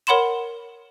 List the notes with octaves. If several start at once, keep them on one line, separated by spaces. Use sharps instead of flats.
A#4 C#5 F#5 B5 C6 E7